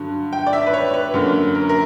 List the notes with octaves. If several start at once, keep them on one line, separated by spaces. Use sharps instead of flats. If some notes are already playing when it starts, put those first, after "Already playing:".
Already playing: G2 D3 F#3
G5
D5
E5
B4
C#5
B4
F#2 D3 A#3
A#4
A#4